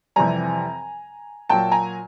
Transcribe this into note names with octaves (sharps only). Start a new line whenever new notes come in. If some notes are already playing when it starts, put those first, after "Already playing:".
F2 C3 E3 G3 G#5 A#5
A#2 F#3 G5 A5
G#5 A#5